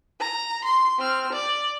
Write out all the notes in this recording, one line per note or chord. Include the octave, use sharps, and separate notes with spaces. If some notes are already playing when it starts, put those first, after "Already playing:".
A#5
C6
C4 F6
D5